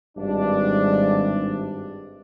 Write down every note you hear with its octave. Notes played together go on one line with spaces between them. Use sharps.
G#1 G2 D4